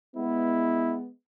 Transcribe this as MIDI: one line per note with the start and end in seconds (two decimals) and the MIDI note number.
0.17 1.09 56
0.17 1.09 59
0.17 0.97 64